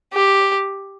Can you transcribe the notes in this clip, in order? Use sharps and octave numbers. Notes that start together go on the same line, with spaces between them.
G4